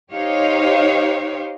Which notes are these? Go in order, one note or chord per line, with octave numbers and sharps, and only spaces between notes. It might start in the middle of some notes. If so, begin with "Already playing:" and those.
D#4 G4 C5 C#5 F5